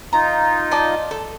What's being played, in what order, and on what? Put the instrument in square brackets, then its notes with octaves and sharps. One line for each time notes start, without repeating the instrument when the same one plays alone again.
[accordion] D#4 F4 [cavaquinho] A#5
[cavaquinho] D5 D#5 A5
A4